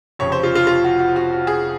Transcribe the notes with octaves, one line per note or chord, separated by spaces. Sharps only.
F1 F2 C#3 C#5
C5
F4
F4
F4
F#4
F#4
F#4
F#4
G#4